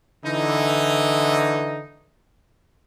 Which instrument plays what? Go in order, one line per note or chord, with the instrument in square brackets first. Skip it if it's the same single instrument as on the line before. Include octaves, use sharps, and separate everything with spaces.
[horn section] D3 E3 D#4